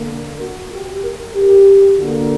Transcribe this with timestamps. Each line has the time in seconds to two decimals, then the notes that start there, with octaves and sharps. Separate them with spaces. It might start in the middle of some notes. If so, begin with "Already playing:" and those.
Already playing: D3 A#3
0.10 A#4
0.41 F#4
0.73 G4
1.04 A#4
1.35 G4
1.98 D3 A#3 F#4